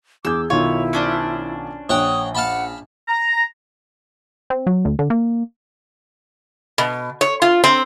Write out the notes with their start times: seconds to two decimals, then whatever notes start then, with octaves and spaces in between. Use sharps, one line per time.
0.25 E2 G#4 D6 E6 G6
0.50 B1 D#3 E4 F4 C#5
0.93 C#4 D4 C5
1.89 A#1 C#5 F#5 G5 D#6
2.35 F5 F#5 A5 B5
3.09 A#5
4.50 C4
4.67 F#3
4.85 D2
4.99 D3
5.10 A#3
6.78 B2
7.21 C#5
7.42 F4
7.64 C4